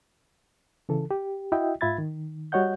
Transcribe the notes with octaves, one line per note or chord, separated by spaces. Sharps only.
C#3 E3 A4
G4
E4 F#4 D#5 E5 G5
G#2 F4 E5 B5 G#6 A6
D#3
G3 F#4 C#5 D#5 F#5 G6